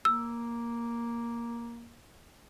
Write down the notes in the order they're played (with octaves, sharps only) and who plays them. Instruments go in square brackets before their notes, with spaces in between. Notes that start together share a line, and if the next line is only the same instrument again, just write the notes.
[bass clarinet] A#3 [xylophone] E6